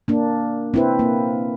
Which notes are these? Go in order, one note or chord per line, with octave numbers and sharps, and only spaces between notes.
A#3 D4
C4 E4 B4
A#3